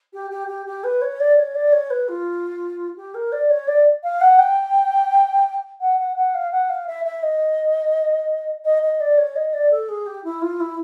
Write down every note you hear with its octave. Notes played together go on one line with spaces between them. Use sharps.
G4
G4
G4
G4
B4
C#5
D5
C#5
D5
C#5
B4
F4
G4
A#4
D5
C#5
D5
F5
F#5
G5
F#5
F#5
F#5
F5
F#5
F5
E5
E5
D#5
D#5
D#5
D5
C#5
D#5
D5
A4
G#4
G4
E4
F4
E4